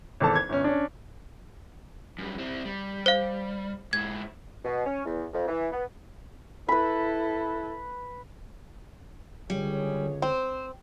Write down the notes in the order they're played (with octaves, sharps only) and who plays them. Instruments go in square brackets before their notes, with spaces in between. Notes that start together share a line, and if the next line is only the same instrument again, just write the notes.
[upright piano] G#1 E2 A4 A5
G#6
G1 C#4
C#4 D4
[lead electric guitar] F#2 G3
C4 E4
G3
[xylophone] C5 F5
[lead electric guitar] G#2 E4 [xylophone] G#6
[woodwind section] B2
C#4
E2
F2
E3
B3
[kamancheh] E4 A4 [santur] B4 B5
[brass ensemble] C#2 G#4 C#5 [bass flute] D3 [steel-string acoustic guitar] G3
[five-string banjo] C4 [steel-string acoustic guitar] C5